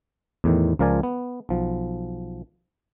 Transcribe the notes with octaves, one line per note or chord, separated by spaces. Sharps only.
E2 A2 D#3
C#2 F3 A#4 D5 G#5
B3
B1 F3